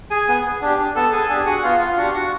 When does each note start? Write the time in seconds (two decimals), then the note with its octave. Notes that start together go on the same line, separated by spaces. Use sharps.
0.11 G#4 G#5
0.28 B3
0.62 D4 G4
0.95 B3 A4 A5
1.12 G#4 G#5
1.29 D4 G4 G#4 G#5
1.46 F#4 F#5
1.63 B3 F4 F5
1.80 F4 F5
1.97 D4 F#4 G4 F#5
2.14 F#4 F#5